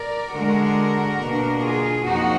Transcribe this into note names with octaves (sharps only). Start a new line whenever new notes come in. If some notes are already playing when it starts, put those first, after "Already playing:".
Already playing: A#4 D5
D3 G#3 D4 F#4 A#4
B2 A#3 D4
F4 G#4
F2 F3 A#3 D#4 F#4